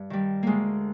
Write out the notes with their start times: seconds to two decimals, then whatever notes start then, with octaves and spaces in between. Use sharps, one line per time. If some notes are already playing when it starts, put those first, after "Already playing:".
Already playing: G2
0.10 D#3 G3
0.43 D2 G#3 A#3